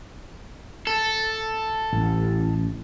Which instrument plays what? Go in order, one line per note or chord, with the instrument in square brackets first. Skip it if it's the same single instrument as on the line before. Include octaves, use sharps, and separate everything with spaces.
[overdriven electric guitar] A4
[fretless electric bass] A1